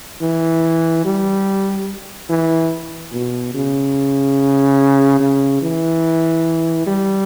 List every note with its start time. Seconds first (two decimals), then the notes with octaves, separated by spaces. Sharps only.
0.22 E3
1.05 G3
2.29 E3
3.13 B2
3.54 C#3
5.20 C#3
5.62 E3
6.87 G3